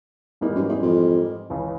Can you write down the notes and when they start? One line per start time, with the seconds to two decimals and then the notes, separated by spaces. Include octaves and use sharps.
0.41 E2 G#2 E3 G3 A#3 D#4
0.55 F#2
0.69 E2
0.83 F2
1.50 C#2 C#3 E3